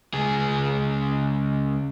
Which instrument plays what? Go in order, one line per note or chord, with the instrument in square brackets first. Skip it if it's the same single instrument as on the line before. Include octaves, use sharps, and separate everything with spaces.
[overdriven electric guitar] C#2 G#4